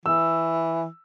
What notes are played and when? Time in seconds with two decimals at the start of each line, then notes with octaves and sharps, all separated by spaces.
0.06 E3 E6